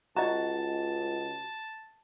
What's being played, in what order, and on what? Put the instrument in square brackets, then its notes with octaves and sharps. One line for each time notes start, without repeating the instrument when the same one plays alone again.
[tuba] C#2 [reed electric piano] F#4 [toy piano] D#5 A#5 [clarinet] A5